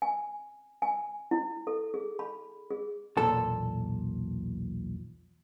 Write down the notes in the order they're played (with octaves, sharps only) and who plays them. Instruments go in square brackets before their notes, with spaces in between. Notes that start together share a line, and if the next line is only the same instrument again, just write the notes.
[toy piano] G#5
G#5
E4
A4
G#4
B5
G#4
[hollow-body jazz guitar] B1 E2 A#2 A4 A5